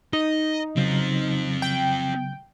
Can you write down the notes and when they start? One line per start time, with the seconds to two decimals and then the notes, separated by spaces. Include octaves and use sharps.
0.13 D#4 D#5
0.77 C#3 F#3 C4 F4
1.62 G5